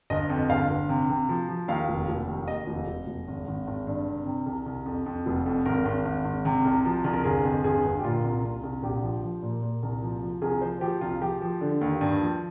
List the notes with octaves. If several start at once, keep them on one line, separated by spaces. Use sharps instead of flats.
G1 D#5
F2
G1 F5
G1
C3
C3
F3
F3
D#2 F5
F1
F1
D#2
D#2 D#5
F1
F1
F1
G#1
G#1
G#1
G2
C3
C3
C2
C2
F2
F2
F1
F2
G#1 A#4
G#1
G#1
G#1
C3
C2
F3
C2
A#4
G1 G#4
F2
G1 G#4
G1
G4
A#2 F4
C2
C2
C2
A#1 G4
F3
F3
A#2
A#2
C2
F3
F3
C2 G#4
F3 C5
F3 G4
C2 F4
F3 G4
F3
D3
D#2
G2
F3